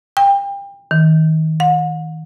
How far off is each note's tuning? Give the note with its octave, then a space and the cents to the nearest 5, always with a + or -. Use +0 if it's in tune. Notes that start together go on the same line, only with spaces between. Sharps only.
G5 +30
D#3 +25
F#5 -45